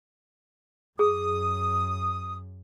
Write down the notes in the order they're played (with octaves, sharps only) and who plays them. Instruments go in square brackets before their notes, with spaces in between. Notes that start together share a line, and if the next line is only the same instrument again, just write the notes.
[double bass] F#2 [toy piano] G#4 [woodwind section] D#6